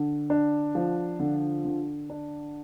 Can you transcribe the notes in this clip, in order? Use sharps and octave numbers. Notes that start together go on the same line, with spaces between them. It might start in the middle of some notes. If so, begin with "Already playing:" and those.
Already playing: D3
D4
F3
D3
D3
D4